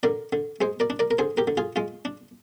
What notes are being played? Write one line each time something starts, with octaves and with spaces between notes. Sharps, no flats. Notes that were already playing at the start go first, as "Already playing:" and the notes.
D3 A#4 D5
D3
G#3 G#4 C5
A#4 D5
D4
A#4 D5
A#4
D3 G#4 C5
G4 A#4
D3
F4 G#4
G#3 F4
D4